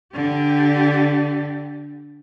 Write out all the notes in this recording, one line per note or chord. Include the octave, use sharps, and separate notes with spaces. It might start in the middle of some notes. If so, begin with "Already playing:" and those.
D3 G4